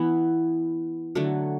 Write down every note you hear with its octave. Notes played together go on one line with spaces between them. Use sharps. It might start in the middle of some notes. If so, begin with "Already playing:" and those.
Already playing: E3 B3 E4
D3 F#3 A3